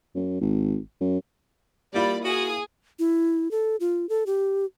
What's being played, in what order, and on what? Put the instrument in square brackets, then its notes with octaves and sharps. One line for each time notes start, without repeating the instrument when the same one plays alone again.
[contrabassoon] F#2
G#1
F#2
[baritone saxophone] G3 [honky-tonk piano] A#3 E4 F4 [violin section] D5 B5
[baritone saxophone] F#4 [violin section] G#4 D#6
[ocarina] E4
A4
F4
A4
G4